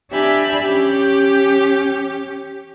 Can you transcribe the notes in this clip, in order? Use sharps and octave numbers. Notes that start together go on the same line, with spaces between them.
D4 G4 E5 G#5 B5
C#4 G4